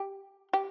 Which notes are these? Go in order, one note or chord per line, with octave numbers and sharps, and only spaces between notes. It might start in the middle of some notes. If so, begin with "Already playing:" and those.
Already playing: G4
G4